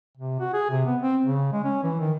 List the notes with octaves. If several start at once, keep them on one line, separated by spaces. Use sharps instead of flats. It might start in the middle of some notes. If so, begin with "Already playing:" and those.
C3
F#4
G#4
C3
B3
C4
C#3
G#3
C#4
E3
D#3